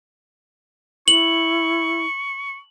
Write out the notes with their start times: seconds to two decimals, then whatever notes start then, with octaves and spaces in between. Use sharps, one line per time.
1.08 E4 C#6 F#7